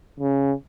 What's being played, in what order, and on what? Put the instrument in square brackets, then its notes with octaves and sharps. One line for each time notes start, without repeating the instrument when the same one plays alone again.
[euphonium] C#3